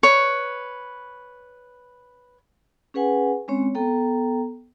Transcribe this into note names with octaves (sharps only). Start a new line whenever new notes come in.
B4 C#5
C#4 G#4 B4 F#5 G#5
G#3 C4 C#4 C#5
B3 A4 G5 A#5